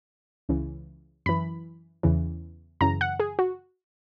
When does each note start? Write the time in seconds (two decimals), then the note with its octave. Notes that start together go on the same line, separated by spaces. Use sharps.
0.49 C#2 C#3 E3
1.26 F#2 E3 B5
2.03 E2 C#3 E3
2.81 F#2 C#3 E3 A#5
3.01 F#5
3.20 G#4
3.39 F#4